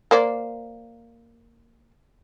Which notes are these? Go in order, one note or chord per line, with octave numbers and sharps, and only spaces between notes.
A#3 C5 D5